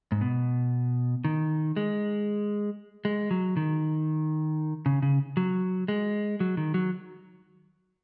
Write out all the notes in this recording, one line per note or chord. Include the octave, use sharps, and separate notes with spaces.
G#2
B2
D#3
G#3
G#3
F#3
D#3
C#3
C#3
F#3
G#3
F#3
D#3
F#3